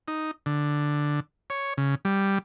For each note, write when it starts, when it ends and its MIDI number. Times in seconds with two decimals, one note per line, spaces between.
0.08 0.31 63
0.46 1.20 50
1.50 1.74 73
1.78 1.95 49
2.05 2.38 55